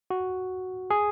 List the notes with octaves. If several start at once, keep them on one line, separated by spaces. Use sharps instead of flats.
F#4
G#4